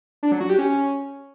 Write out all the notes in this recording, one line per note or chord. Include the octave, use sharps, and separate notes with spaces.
D4
F#3
F#4
G4
C#4